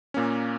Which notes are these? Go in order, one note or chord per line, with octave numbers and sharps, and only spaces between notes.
A#2 A#3 C#4